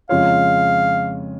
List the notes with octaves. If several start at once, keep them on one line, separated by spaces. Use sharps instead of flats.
F2 C#3 G#3 F4 C#5 F5